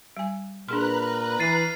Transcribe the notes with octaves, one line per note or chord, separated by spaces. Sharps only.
G3 G#5
A#2 D4 G#4 B4 A#5 C6 F6 F#6
E3 A6 C7 D#7